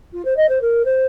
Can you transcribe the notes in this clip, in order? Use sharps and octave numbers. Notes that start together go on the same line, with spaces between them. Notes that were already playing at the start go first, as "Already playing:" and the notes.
F4
C5
D#5
C5
A#4
C5